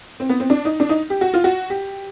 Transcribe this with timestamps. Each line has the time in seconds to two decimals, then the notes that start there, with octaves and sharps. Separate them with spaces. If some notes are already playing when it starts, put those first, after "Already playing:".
0.20 C4
0.29 B3
0.40 C4
0.50 D4
0.65 D#4
0.80 D4
0.89 D#4
1.10 G4
1.21 F#4
1.34 F4
1.44 F#4
1.70 G4